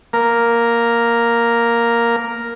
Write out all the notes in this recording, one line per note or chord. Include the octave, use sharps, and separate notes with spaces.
A#3 A#4